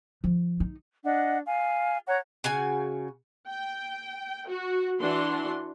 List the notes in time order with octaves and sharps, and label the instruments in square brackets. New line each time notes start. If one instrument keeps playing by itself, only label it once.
[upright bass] F3
D#4
[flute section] D4 D#5 F#5
F5 G#5
C#5 F#5 A#5
[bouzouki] C#3 F#4 G#5
[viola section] G5
F#4
E3 D4 F#4 C6